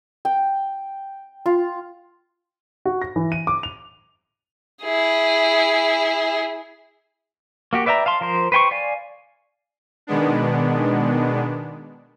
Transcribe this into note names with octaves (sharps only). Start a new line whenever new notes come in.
G5
F4
F#4
A#6
E3
D#7
D6
F7
E4 G#4
A#3 F#4 G4
B4 D5 E5 G5 A#5
F5 A5 C6
F3 A#4 C5
B4 C5 G5 G#5 C#6
D5 F5 G#5
B2 D#3 G#3 B3 D4